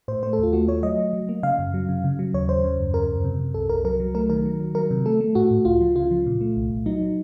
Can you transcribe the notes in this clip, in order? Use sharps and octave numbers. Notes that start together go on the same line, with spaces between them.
A2 C5
A3 C5
A4
D#2 F4
A3 F#4
A3 C#5
F#3 D#5
F#3
F#3
A#3
C#3 F5
F#2
F#3
C#3
C#3
F#3
D#2 C#5
D#2 C5
C#3
F#2
C#3 A#4
F#2
C3
C3
C2 A4
C2 A#4
F#3 A#4
F#3
A3 A#4
D#3 A#4
F#3
F#3
F#3 A#4
C3
A3 A4
A3
A2 F#4
A2
C#2 F4
F3
C#3 F4
F3
A#2
A3
C2
C2
F#3 D#4
F#3